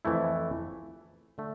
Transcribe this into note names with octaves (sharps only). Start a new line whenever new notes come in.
F2 E3 A3 E4
D3 A3